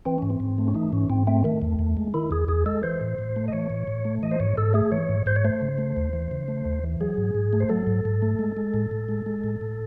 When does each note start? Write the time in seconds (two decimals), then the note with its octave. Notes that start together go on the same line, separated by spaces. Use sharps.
0.05 E3 C4
0.18 G#2 C#4
0.30 C4
0.40 G#2
0.58 A3
0.68 C#4
0.74 E3 D#4
0.92 G#2 C#4
1.10 G#2 C4
1.27 A3 C4
1.44 D#3 A3
1.62 E2
1.79 E2
1.97 G#3
2.14 D#3 E4
2.31 E2 G#4
2.48 E2 G#4
2.66 G#3 A4
2.83 E3 C5
3.01 A2
3.18 A2
3.36 A3
3.48 D#5
3.52 E3 C#5
3.70 A2
3.87 A2
4.05 A3
4.23 E3 D#5
4.31 C5
4.40 G#2 C#5
4.57 G#2 A4
4.74 A3 G#4
4.92 E3 C#5
5.09 G#2
5.26 G#2 C5
5.36 C#5
5.44 A3 C5
5.62 C#3
5.78 A3
5.97 D#2
6.13 E3
6.31 C#3
6.48 A3
6.65 D#2
6.83 E3
7.01 F#3 G#4
7.18 G#2
7.35 G#2
7.53 A3
7.60 C5
7.69 F#3 A4
7.87 G#2
8.05 G#2
8.22 A3
8.39 G#3
8.57 G#3
8.74 A2
8.91 A2
9.09 G#3
9.26 G#3
9.44 A2
9.61 A2